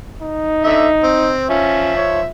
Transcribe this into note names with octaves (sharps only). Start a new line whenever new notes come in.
D#4
D3 E5
C4
F3 C#4 E5
C#5